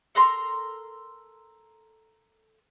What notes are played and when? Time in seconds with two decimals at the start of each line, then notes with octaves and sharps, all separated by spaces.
0.15 A4 A#4 A#5 C6